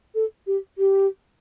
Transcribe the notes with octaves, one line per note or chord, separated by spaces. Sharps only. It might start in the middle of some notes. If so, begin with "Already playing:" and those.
A4
G4
G4